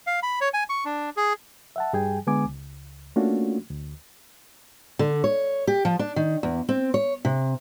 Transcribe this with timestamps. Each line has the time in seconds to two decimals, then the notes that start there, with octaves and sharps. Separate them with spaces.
0.07 F5
0.23 B5
0.41 C#5
0.54 G#5
0.69 C#6
0.85 D4
1.17 G#4
1.76 E5 F#5 A5
1.93 G2 G3 G#4 G5 G#5
2.27 D3 G#3 B3 G#5 D6
2.45 C#2
3.16 A3 A#3 C#4 D4 F4 F#4
3.70 D2
4.99 D3
5.24 C#5
5.67 G4
5.85 F3
5.99 D4
6.16 D#3
6.43 E2
6.69 C4
6.94 C#5
7.25 C3